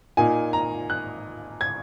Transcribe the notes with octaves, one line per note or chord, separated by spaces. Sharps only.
A#2 A#3 D#4 G#5
A#5
F#6
G#6